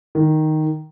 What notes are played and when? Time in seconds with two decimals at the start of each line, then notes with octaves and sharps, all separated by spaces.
0.15 D#3